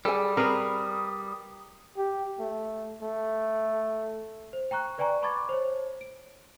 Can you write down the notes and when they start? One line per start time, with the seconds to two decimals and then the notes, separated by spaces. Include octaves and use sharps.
0.05 G3 G#4 A4 G#5
0.37 C4 G#4 A#4 B4 D#6
1.98 G4
2.39 A3
3.02 A3
4.53 C5
4.71 G5 A#5 C#6 F#6
4.98 B4 D5 G5 G#5 A#5 C#6
5.22 A5 B5 C#6 D6 G#6 A6
5.49 C5 C#5
6.01 D7